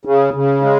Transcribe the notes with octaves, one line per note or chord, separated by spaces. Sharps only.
C#3
C#3
G#3